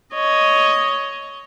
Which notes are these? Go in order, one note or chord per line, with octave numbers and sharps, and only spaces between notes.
C#5 D#5